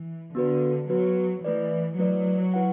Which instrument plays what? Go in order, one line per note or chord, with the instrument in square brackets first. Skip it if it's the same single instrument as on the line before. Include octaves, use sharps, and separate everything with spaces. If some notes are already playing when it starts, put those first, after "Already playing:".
Already playing: [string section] E3
[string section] D3 [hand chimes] B3 F#4 B4
[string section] F#3 [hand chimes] B3 F#4 B4
[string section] E3 [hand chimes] A3 E4 B4 D5
[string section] F#3 [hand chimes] A3 E4 B4 D5
[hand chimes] E4 B4 F#5